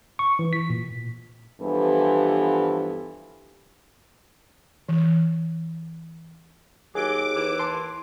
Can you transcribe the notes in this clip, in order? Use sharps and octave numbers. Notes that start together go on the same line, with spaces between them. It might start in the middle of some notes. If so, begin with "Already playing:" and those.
C#6
E3
B6
A#2
G2 E3 F3 B3 G4 A4
E3
D#2 F#3 G#4 D6
E3
A5 C6